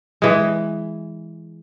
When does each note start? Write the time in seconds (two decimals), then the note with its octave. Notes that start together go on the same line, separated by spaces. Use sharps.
0.22 E3 G#3